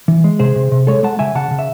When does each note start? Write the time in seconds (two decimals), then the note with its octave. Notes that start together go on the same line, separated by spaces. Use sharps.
0.08 E3
0.24 G#3
0.39 C3 G#4 C5
0.56 C3
0.72 C3
0.87 G#3 A4 C#5
1.03 G#3 F#5 A5
1.19 C#3 E5 G#5
1.35 C#3 F#5 A5
1.51 C#3
1.59 E5